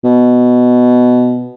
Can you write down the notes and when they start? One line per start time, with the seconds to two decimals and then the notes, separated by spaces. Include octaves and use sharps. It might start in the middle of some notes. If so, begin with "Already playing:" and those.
0.04 B2